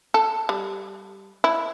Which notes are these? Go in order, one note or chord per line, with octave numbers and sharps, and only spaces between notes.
A4
G3
E4